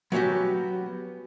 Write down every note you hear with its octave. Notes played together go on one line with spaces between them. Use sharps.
F#3 B3 C#4 D#4 F#4 G4